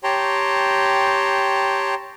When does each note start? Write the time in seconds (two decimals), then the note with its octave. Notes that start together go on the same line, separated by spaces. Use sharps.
0.04 G4 C#5 G5 A5 A#5 C6